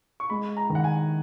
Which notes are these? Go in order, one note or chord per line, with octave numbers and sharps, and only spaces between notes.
C#6
G#3 B5
A#5
D#3
F#5
G#5